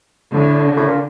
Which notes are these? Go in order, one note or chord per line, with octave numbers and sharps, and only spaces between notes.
A2 D3
A2
A#2